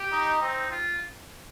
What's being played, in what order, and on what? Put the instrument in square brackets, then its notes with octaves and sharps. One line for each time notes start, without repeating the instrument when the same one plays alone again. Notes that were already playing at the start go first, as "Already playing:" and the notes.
Already playing: [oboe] G4
[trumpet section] D#4
[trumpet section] C4 [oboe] D#4
[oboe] F4